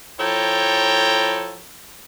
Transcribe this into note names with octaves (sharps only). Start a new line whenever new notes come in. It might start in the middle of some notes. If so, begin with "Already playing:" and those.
F3 E4 A4 C#5 G5 A#5